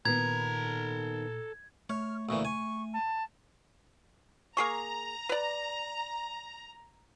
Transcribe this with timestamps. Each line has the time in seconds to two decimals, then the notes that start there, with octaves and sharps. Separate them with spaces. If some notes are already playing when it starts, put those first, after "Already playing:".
0.05 A#2 D#3 B3 A4 A#5 G#6
1.90 A3 C#5 F6
2.29 D2 A#2 E3 C#6
2.45 G#5 C#6
2.93 A5
4.57 A#3 G#4 A#5 C#6
5.29 B4 D5